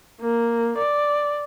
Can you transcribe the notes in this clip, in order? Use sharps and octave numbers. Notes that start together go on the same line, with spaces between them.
A#3
D5